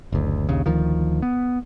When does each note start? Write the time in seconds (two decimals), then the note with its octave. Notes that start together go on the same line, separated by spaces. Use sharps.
0.12 F#1 D2
0.49 A#1 D#2 C#3
0.66 D2 D#3 F3
1.22 B3